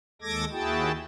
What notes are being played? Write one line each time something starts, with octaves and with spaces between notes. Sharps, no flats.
D#2 G#3 A4 D6 G#6 A#6
D#2 E4 F#4 G#4 G5 A5